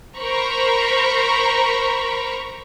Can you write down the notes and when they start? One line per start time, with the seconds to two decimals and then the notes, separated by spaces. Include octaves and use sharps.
0.16 A#4 C5 A#5 B5 C#6